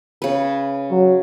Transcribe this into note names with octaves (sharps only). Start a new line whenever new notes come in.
C#3 B4
F#3